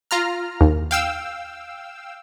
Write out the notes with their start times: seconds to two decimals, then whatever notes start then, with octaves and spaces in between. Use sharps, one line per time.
0.11 F4 A#5 F6
0.61 D#2
0.91 F5 G5 E6